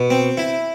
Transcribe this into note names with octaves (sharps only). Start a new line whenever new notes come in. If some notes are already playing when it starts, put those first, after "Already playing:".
Already playing: B2
C4
E4